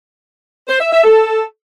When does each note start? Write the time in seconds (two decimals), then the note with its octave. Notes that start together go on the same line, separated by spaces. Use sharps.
0.68 C5
0.80 E5
0.92 E5
1.04 A4